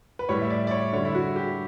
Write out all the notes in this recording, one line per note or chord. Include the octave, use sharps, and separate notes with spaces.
B4
A2 G3 C#5
E5
D5
D5
C#5
D3 G3 C#5
E4
F#4
G4